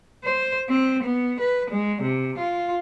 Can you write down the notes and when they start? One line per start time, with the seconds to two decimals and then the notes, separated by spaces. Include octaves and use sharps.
0.24 C5
0.69 C4
1.03 B3
1.40 B4
1.70 G#3
2.02 C3
2.38 F4